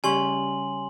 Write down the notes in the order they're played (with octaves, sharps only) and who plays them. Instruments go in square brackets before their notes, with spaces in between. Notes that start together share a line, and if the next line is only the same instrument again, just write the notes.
[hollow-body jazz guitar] C#3 G3 C#4 [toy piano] G4 D5 [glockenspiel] G#5 C6 F#7